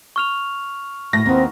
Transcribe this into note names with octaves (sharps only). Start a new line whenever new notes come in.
C#6 F6 F7
A2 A3 A#6
D#2 B3 C4